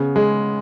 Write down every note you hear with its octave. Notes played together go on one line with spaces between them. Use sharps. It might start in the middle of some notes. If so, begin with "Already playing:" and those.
Already playing: C#3 B3
G#3